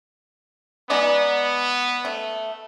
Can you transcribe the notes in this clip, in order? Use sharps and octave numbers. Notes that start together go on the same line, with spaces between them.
G#3 B3 D#4 D5
A3